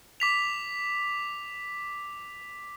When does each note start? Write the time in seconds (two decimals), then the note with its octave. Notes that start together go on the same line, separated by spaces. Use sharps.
0.20 D6 B6 F7